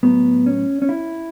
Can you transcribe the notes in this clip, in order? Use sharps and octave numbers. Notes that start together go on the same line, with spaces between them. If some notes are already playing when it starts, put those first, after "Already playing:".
A2 F#3 B3
C#4
C#4
E4